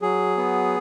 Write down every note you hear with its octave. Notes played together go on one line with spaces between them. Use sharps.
F#3 G#4
B3